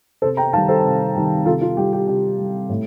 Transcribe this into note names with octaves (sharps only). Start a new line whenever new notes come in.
C3 A4 C5
G5 A#5
D#3 G3 F5 A5
A4 C5
C3
D#3 G3
C3 F4 A4
F4
G3 G4
G4
C3 G4
G3
A2